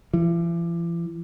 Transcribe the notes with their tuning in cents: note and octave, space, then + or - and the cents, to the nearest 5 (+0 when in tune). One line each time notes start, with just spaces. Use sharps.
E3 +45